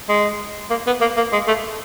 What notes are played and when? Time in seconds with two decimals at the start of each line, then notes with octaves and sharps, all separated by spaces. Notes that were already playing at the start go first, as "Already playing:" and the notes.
0.09 G#3
0.70 A#3
0.87 B3
1.01 A#3
1.17 A#3
1.32 G#3
1.48 A3